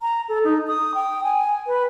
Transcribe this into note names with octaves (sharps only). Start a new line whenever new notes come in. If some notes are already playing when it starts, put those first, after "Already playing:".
A#5
A4
D#4
D#6
G5
G#5
B4